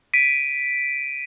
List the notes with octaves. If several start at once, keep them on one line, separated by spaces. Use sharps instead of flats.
B6 D7 D#7